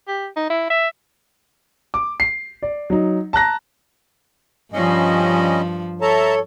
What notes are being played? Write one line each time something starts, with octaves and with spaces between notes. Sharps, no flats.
G4
D#4
E4
E5
D6
C7
D5
F#3 D#4
A5 A#5 F#6 A#6
G2 F3 G3 C#4 D#5
A4 C#5 E5 A5 A#5